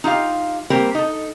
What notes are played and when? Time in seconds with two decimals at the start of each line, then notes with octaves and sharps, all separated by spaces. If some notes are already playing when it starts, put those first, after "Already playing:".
0.04 D#4 F4 G4 F5
0.70 G3 A#3 C4 G4 A#4
0.95 D#4 A4